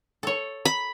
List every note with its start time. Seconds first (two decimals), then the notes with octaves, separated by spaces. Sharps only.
0.23 A4 C#5
0.65 B5